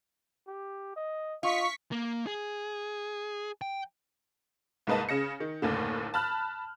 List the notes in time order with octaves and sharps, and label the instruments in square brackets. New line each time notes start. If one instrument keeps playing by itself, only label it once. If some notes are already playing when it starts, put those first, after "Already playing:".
[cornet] G4
D#5
[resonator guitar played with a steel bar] F4 [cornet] D#5 [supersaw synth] C#6 B6
[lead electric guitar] A#3
G#4
G5
[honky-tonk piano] C2 G#2 A#3 B4 D#5 A5
C#3 A#6 C#7
D#3
F#1 D#2 A2 D3
A5 B5 F6 F#6